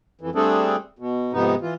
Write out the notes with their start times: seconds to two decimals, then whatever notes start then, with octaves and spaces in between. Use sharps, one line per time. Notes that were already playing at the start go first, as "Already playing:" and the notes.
0.21 F2 E3
0.35 G3 A3 C4 D4 G#4 A4
0.99 B2
1.33 F2 G#2 C3 B3 D#4
1.62 E3 F4